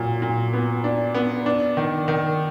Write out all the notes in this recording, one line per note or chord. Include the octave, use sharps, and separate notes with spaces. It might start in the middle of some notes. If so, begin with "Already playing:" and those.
Already playing: A#2 F#3
A#2
B3
D4
B3
D4
D#3
D#3